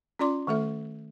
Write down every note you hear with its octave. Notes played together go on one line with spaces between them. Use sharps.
C#4 F4 D5 C6 D6
D#3 A3 A4 E5